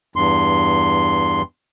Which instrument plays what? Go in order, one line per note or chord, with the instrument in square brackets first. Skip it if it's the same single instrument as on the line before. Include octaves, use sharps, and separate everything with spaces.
[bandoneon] E2 G2 C6